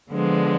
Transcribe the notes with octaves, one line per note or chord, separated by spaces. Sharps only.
D3 F3 G#3 B3 D4